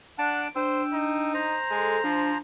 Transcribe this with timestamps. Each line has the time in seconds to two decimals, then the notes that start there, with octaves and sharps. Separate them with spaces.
0.19 D4 F#5 A5 D7
0.56 D4 C5 G5 E6
0.93 D#4
1.34 C5 A#5
1.70 G#3 A4
2.04 F3 D4